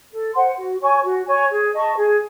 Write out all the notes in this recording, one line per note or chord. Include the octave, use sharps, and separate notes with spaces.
A4
C5 F#5 C6
F#4
C#5 G#5 C#6
F#4
C#5 G#5 C#6
G#4
D#5 A5 C#6
G#4